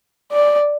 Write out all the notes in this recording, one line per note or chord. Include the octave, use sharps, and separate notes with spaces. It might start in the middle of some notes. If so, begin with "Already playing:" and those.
D5